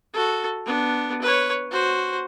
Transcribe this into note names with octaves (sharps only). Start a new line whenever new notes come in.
F#4 A4
B3 D4
B4 C#5
F#4 C5